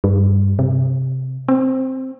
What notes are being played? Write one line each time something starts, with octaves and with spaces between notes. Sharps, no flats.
G2
C3
C4